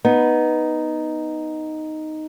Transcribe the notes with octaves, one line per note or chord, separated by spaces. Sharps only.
B3 D#4